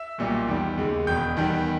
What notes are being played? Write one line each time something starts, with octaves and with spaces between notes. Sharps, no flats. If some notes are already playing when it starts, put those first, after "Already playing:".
Already playing: E5 E6
B1 A#2 G3
E2 D#3 G3
D#2 C#3 G#3
E1 E2 B2 G5 G6
E2 D#3 G3